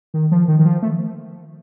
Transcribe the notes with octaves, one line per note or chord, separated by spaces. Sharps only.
D#3
F3
D#3
D#3
F3
A3